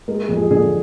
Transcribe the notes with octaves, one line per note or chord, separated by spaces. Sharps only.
G#3 A#4
G#4
F2
G#4
D3 G#4